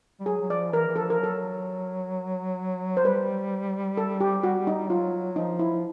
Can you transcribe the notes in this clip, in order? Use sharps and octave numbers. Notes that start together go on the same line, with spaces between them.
G3
F#3 G#4
F#3
F3 D5
E3 A#4
E3
F3 A4
A#4
F#3 A4
C5
G3 B4
A4
G4
F#4
D#4
F#3 F4
F3 D#4
E4